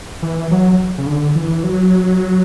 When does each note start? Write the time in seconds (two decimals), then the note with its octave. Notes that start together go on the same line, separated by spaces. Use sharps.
0.22 E3
0.51 F#3
0.98 C#3
1.07 D3
1.35 E3
1.64 F#3